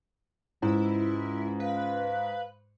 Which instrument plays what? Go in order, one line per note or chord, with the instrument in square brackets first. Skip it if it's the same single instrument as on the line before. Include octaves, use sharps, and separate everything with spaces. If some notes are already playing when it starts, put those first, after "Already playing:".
[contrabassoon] C#2 [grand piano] G#2 [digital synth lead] E4
[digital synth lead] B4 [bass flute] F5